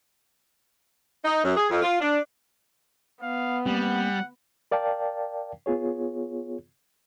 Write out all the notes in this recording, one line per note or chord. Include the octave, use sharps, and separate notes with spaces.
D#4
F#2
G#4
F2
F4
D4
B3 F5
G3 A#3 C4 F#5
A#4 D5 F5 G5 A5
B3 F4 G#4 C#5